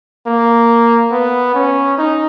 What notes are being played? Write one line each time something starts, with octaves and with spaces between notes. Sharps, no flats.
A#3
B3
C#4
D#4